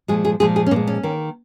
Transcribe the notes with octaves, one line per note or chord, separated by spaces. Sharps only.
A#2 F3 G#3 G#4
G#4
A#2 F3 G#3 G#4
G#4
C#4
A#2 F3 G#3 A#3
C#4
D#3 A#3